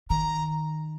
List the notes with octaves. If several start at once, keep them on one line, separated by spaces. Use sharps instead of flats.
D#3 A#5